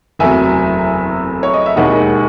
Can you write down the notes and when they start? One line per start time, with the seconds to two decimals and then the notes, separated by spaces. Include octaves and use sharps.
0.19 F#1 E2 C3 F#3 A3 E5 G#5
1.43 C#5
1.54 D#5
1.66 E5
1.76 E1 D#2 D#3 G#3 D#5 F#5